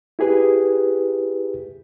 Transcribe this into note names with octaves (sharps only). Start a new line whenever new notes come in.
E4 G4 G#4 B4